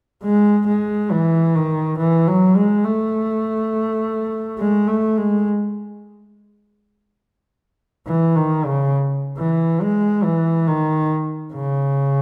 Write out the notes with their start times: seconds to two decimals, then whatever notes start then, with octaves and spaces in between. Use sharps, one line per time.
0.24 G#3
0.67 G#3
1.12 E3
1.55 D#3
1.98 E3
2.28 F#3
2.56 G#3
2.85 A3
4.58 G#3
4.88 A3
5.17 G#3
8.07 E3
8.36 D#3
8.65 C#3
9.37 E3
9.81 G#3
10.24 E3
10.67 D#3
11.54 C#3